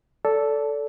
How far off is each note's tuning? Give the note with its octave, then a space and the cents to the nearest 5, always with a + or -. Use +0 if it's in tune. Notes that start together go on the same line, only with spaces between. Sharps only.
A4 +0 D5 -30